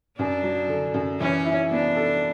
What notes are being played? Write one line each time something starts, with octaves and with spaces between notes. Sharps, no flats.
F#2 D4
F#3
D3
F#2
E3 C#4
E4
B3 D4
A4